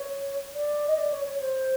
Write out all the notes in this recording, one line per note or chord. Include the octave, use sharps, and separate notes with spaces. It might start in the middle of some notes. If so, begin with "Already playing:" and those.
Already playing: C#5
D5
D#5
D5
C#5
C#5
C5